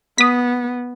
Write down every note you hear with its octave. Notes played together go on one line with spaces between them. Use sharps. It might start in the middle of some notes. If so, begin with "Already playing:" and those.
B3 D#6 B6